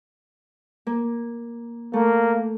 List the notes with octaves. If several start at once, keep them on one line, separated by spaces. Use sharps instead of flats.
A#3
A3 A#3